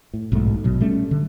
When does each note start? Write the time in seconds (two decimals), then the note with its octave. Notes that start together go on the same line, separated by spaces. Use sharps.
0.14 A2
0.32 B1 G#2 G#3 A3
0.64 A#1 B2 F#3
0.81 G3 A3 C#4
1.11 D3